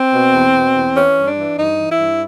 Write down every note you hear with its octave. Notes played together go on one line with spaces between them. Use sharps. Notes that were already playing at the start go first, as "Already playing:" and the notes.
Already playing: C4
B2
E2
B2
E2
E3 C#4
G2
D4
E3
G2 D#4
E3
E4
G2